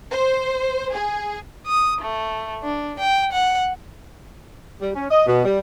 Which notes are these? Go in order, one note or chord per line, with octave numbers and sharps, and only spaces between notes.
C5
G#4
D#6
A3
D4
G5
F#5
G3
C#4
D#5
B2
G3